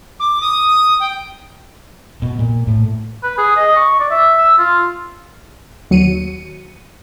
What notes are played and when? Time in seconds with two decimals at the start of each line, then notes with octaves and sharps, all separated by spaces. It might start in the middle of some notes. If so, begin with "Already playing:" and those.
0.20 D6
0.41 D#6
1.00 G5
2.22 B2
2.39 A#2
2.67 A2
3.23 B4
3.38 G#4
3.57 D#5
3.76 C#6
4.00 D5
4.11 E5
4.37 E6
4.59 F4
5.90 D#2 F#3 C#7 D#7